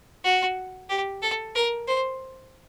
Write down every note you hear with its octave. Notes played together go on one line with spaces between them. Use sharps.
F#4
G4
A4
A#4
C5